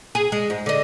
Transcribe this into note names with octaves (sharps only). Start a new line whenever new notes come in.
G#4
G#3
G#2
D3 D#5